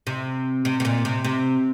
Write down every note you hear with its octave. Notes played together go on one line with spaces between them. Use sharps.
C3
C3
C3
A#2
C3
C3